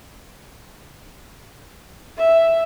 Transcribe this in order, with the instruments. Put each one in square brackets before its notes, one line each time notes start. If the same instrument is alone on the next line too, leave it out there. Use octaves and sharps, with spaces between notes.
[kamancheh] E5